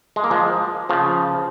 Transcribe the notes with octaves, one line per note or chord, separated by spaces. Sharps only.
G#3
A#3
F3 G#3
C#3 F3